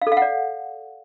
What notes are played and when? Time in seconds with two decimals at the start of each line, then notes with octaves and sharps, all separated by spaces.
0.02 F5
0.07 A4
0.12 F5
0.17 F#5
0.22 D5